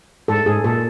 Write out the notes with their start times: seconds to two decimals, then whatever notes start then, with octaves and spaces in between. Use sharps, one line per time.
0.28 G#2 A4
0.46 G#2 G#4
0.64 A#2 A4